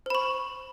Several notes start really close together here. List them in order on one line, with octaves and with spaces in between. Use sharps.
C5 B5 C#6